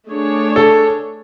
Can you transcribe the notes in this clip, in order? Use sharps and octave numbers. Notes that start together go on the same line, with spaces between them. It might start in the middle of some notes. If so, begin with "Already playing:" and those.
A3 D4 G#4 C#5
A4